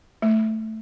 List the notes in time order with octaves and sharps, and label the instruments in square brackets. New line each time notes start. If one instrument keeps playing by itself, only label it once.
[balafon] A3